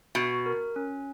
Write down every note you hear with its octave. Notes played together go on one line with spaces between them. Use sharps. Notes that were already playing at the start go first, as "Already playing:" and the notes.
B2 F#4
A#4
C#4